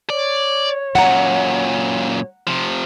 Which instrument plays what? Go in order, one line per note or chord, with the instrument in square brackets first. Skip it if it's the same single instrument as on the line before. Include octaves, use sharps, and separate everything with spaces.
[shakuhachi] C#5 [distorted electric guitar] D5
[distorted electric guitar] F#2 A#2 [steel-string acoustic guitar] F#5 A#5
[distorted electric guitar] C3 F3